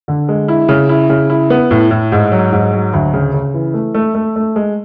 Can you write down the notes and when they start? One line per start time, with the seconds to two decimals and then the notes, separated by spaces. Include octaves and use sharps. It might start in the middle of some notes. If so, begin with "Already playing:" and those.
0.08 D3
0.29 G#3
0.48 E4
0.69 C#3
0.89 E4
1.10 C#3
1.30 E4
1.50 B3
1.71 A2
1.91 A2
2.12 G#2
2.32 F#3
2.52 G#2
2.73 F#3
2.93 D2
3.14 C#3
3.34 C#3
3.54 E3
3.74 A3
3.94 A3
4.15 A3
4.36 A3
4.56 G#3